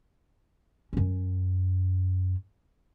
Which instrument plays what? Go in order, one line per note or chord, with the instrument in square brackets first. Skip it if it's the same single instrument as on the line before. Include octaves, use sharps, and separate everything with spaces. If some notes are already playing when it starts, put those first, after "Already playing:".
[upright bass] F#2 C#4